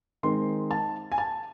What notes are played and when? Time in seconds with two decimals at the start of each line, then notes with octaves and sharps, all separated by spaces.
0.23 D#3 G#3 C4 C6
0.71 A5
1.12 G#5
1.18 A5